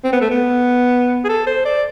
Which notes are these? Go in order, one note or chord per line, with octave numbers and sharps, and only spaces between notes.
C4
B3
A3
B3
G#4
A4
C5
D5